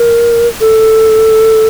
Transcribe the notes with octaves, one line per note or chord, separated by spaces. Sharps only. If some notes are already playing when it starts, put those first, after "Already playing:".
Already playing: A#4
A4